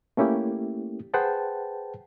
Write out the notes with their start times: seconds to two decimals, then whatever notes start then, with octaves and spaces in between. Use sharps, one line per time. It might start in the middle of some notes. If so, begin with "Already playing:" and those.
0.17 A3 A#3 C#4 E4 G4
1.14 G#4 B4 C5 F#5 G5 A5